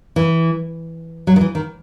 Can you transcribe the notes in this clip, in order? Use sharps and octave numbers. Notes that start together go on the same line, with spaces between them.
E3
F#3
D#3
E3
D#3